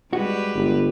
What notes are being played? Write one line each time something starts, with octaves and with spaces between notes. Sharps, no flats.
G3 G#3 F#4 B4
G1